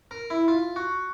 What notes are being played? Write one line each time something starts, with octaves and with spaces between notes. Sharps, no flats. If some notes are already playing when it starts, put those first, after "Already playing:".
A#4
E4
F4
F#4